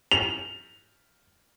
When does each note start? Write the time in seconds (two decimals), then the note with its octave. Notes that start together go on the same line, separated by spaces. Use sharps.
0.11 F7